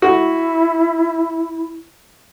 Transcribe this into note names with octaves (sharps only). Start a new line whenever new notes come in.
E4 F#4